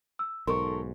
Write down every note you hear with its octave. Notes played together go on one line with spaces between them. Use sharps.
E6
B1 G#2 A4 A#4 C6 C#6